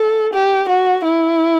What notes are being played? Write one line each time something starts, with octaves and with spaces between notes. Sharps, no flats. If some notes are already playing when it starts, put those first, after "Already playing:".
Already playing: A4
G4
F#4
E4